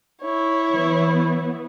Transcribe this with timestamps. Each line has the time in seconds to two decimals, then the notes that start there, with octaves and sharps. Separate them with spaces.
0.21 E4 C#5
0.72 E3 B3